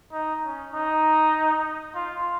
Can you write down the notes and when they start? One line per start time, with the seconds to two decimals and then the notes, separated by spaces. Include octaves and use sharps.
0.13 D#4
0.44 C#4
0.74 D#4
1.95 F4